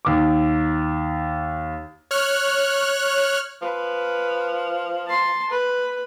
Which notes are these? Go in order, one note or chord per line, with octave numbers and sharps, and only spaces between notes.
D#2 D6
C#5 F6 F#6
F3 B4
A5 C6
B4